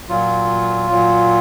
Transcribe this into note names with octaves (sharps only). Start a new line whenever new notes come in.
A#2 F#3 F4
A#2 F#3